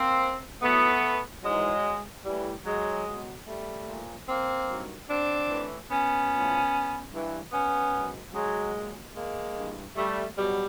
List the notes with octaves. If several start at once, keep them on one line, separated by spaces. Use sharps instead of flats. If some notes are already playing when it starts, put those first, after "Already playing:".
Already playing: A#3 C4
A2 F#3 A3 B3
G#2 E3 F#3 G#3
A2 E3 G3
F#3 G#3
B2 F#3
G3 A3
A#2 F3
A#3 C4
G2 D#3 F#3
C4 D4
A2 E3
B3 C#4
A2 F3
G2 E3
B3 C#4
G#2 D#3 F#3
F#3 G#3
A#2 F#3
G#3 A#3
G2 E3
G3 A3
B2 F#3 G3